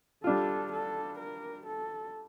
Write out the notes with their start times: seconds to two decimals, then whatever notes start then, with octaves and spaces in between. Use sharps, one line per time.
0.24 G3 D4 F4 A4
0.72 A4
1.19 A#4
1.66 A4